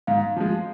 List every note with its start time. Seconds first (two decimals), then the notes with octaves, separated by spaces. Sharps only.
0.07 G#2 F5
0.36 F3 G#3